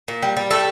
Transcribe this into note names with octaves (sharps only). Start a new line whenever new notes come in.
A#2
G3
G3
A3 A4